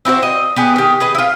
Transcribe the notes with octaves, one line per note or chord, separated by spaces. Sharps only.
C4 E4 F#4 C5
D#5
B3 G4 G#4
D#3 G4
G#4 B4 D#5
E4 F4